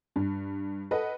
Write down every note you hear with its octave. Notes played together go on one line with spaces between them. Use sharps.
G2
A4 B4 D#5 F#5